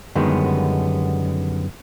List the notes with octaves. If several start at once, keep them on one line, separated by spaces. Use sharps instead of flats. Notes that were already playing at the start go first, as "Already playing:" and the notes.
F#2 D3 D#3 G3 G#3 B3